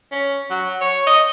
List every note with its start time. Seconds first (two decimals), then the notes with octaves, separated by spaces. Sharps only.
0.12 C#4
0.50 F#3
0.81 C#5
1.07 D#5